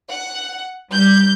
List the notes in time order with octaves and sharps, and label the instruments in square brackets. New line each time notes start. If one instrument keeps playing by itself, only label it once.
[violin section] F#5
[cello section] G3 [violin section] G6